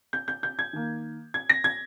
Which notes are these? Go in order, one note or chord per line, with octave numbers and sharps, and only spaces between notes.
G6
G6
G6
G#6
D#3 A#3
G#6
A#6
G#6